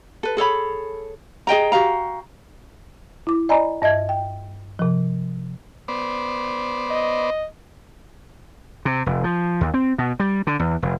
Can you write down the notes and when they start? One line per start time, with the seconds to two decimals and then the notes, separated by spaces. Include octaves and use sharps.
0.23 A4 B4
0.37 G#4 A4 C#5 B5
1.47 G#4 D#5 G5 A#5
1.72 F#4 G4 F5 A#5
3.27 E4 D6
3.49 D5 D#5 G#5 A#5 B5
3.82 G2 D#5 E5 G#6
4.09 G5
4.79 C3 F3
5.88 B3 C5 D5
6.91 D#5
8.85 C3
9.06 F1
9.24 F3
9.61 D#2
9.74 C4
9.98 B2
10.20 G3
10.47 D3
10.59 E2
10.82 F1